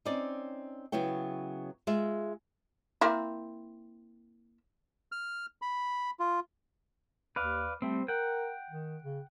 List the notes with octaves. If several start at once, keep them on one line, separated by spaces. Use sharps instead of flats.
C4 C#4 D#4 D5
C#3 F#3 B3 E4 C#5 G5
G#3 F4 E5
A#3 C4 E4
F6
B5
F4
D#2 B4 D5 F5
G3 A3 C4
A#4 F#5 G5
D#3
C#3